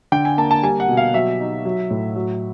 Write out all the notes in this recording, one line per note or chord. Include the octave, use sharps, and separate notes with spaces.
D3 G5
G#5
A#3 A5
A5
G3 G#5
F#5
B2
F5
F#3 E5
D#4
F#3
A2
F#3